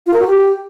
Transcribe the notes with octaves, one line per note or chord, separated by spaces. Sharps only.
F4
A#4
F#4
G4